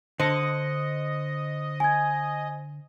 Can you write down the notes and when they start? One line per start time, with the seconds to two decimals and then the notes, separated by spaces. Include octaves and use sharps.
0.20 D3 C5 D#5 C#7
1.80 G#5 G#6